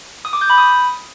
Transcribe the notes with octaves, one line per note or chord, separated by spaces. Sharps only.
D#6
D6
G6
B5
D#6